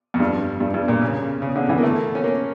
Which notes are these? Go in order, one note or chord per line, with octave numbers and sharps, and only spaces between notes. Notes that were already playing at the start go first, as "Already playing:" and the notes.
F2
G2
G2
G2
A#2
C#3
C#3
D3
E3
A#3
A3
C#4
A#3